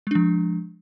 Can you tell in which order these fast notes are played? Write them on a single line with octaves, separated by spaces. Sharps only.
G#3 D4 F3